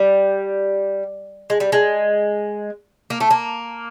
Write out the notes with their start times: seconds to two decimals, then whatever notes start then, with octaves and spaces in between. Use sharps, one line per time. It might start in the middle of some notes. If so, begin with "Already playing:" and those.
Already playing: G3
1.50 G#3
1.60 G3
1.72 G#3
3.10 A#3
3.20 A3
3.31 A#3